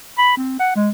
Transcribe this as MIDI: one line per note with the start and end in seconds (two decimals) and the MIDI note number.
0.18 0.35 83
0.37 0.59 60
0.60 0.71 78
0.76 0.90 56